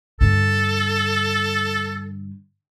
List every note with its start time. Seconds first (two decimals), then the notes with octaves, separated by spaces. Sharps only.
0.21 G2 D3 A4